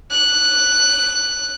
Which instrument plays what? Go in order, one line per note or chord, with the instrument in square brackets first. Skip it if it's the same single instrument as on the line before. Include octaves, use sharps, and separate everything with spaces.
[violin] F#6